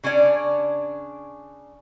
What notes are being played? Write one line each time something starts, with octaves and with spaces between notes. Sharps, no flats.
C#3 C#4 D4 D5